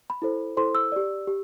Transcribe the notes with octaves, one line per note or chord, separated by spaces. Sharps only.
B5
E4 A4 C5
E4 A4 C5 C6
E6
G4 D5
G4